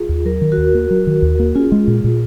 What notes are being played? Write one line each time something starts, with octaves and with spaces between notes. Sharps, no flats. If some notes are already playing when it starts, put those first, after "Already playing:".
Already playing: F4 G#4
D#2
F#3 A#4
D#3
F#4 A#4
D#2
A#3
F#3
D#3
D#2
A#3
C#4 F4 G#4
G#3
A#2
A#2